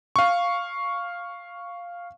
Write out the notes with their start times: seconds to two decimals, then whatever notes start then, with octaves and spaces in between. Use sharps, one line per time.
0.16 F5 C#6